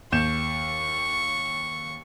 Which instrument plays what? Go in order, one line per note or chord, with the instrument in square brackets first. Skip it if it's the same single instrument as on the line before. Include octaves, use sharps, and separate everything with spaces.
[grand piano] D#2 G6 E7 [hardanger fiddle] C#6